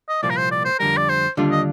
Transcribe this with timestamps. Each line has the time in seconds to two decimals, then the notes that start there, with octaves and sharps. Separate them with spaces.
0.09 D#5
0.23 C2 A#2 F3 A#3 D5
0.30 A#4
0.37 C5
0.52 D5
0.65 C5
0.80 F2 D3 G3 A#4
0.97 D5
1.09 C5
1.37 D#2 D3 G3 D4 F4
1.51 D#5